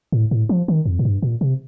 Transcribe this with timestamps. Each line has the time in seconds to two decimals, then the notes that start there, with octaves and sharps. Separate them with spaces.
0.12 A2
0.31 A2
0.49 F3
0.68 D#3
0.86 F2
0.99 A2
1.05 G2
1.22 A#2
1.41 C3